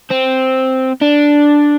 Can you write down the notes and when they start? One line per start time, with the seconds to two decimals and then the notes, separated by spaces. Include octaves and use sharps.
0.11 C4
1.02 D4